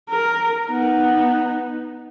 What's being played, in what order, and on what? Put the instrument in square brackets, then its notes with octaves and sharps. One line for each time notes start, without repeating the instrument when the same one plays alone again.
[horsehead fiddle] A#4
B3 D#4